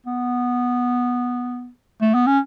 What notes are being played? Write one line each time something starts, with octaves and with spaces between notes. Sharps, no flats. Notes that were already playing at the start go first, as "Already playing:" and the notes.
B3
A3
B3
C#4